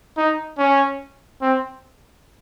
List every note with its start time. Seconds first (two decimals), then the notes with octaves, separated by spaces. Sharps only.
0.17 D#4
0.58 C#4
1.42 C4